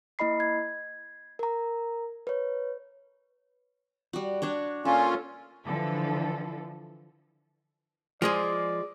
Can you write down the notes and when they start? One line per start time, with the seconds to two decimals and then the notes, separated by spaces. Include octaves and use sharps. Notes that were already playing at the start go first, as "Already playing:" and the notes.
0.19 A#3 E4 D#5 B5 C7
0.40 G#6
1.39 A#4 A#5
2.27 B4 C#5
4.13 G3 F#4
4.42 D4 F#4 C#5
4.85 A#2 C#4 F4 A4
5.64 D3 E3 F3 A4
8.22 F3 G#3 G#4 D5